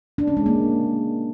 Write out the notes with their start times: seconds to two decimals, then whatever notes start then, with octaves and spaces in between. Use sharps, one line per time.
0.18 D4
0.27 C#4
0.37 G#3
0.46 A#3